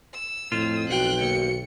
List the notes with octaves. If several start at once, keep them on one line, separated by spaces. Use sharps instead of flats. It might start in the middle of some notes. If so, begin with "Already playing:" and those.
E6
F2 A2 F4
B1 F#4 G5 F#6
D#2 C#7